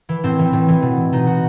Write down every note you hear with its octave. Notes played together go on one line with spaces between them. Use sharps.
E3
A2 C4
E3
A2
E3
B2
B2 D#4
F#4